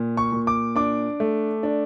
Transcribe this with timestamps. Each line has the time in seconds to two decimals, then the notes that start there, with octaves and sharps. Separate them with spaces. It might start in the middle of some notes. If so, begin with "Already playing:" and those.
Already playing: A#2
0.17 C#6
0.32 A#2
0.47 D6
0.76 D4 D6
1.20 A3
1.63 D4